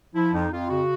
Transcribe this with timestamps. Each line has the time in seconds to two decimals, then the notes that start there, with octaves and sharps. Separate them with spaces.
0.15 F3 E4
0.33 F2 D#4
0.51 F2 F4
0.69 C#3 F#4